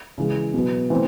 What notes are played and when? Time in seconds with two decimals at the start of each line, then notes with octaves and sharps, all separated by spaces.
0.18 C#3 E3 G#3
0.54 B2 F#3 B3
0.90 E3 A3 C4